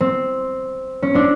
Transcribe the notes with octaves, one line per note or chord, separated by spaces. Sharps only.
C4
C#4
C4 D4